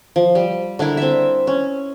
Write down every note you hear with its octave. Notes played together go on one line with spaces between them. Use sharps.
F3
G3
D3 D4 E4 A#4
C4 E5
C#4